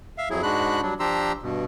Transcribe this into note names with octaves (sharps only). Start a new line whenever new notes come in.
E5 F5
F2 F#3 E4 G#4
G#2 G#3 D4 F#4 B5 F#6
F#3 G3 D4
F3 D4 G4 A#5 C6 E6
G2 B2